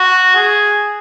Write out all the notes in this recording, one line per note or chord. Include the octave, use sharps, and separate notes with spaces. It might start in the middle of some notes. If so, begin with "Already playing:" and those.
Already playing: F#4
G#4